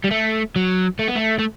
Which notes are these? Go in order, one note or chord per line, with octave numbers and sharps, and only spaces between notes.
G3
A3
F#3
A3
B3
A3
A3